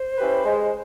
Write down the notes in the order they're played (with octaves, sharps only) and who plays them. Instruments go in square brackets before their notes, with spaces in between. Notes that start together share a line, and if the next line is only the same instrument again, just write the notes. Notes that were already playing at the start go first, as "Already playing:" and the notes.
Already playing: [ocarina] C5
[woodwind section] C#4 E4 G4 B4
G#3